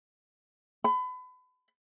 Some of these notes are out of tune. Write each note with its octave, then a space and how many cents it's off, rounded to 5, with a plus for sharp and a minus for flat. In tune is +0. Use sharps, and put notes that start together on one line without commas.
B5 +35